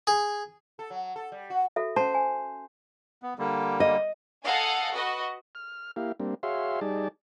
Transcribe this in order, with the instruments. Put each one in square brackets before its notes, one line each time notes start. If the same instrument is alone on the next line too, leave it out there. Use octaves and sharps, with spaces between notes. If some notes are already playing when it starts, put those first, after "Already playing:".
[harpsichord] G#4
[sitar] A4
F#3
A4
G3
F#4
[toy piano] F#4 A4 E5
[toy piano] C#4 A5 [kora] C5
[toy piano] G#5
[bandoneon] B3
D3 G3 A#3
[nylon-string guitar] D#5
[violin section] A4 D#5 F5 F#5 G#5
F#4 B4 D#5
[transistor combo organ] F6
A#3 E4 G4 F5
G3 A#3 C4 D4
F#4 G#4 C#5 E5 F5 C6
G3 D#4 G#4 D5 A5